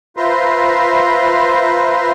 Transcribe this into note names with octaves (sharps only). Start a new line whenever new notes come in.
F4 B4 C5 E5 A#5 C6